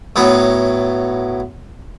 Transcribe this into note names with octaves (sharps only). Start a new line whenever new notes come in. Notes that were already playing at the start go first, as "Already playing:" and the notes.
A2 F#3 B3